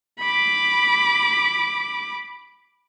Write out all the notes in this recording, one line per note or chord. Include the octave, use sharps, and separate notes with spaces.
B5 D6